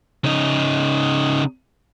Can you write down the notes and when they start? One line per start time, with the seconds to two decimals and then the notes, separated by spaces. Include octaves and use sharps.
0.24 C#3 D#4